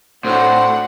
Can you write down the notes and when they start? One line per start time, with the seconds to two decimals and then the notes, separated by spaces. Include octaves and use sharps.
0.25 A2 C4 D4 F#4 F#5